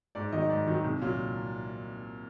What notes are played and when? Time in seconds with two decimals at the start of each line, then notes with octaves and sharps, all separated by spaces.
0.15 G#2 D5
0.32 D#3 F#3 D#5
0.50 G#2 D5
0.67 D#3 F#3
0.84 C2
1.01 A#2 F#3